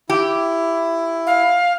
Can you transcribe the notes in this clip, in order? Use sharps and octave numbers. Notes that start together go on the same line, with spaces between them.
E4 G4
F5